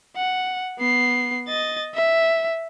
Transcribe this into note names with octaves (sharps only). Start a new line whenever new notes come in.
F#5
B3 C7
D#5 A6
E5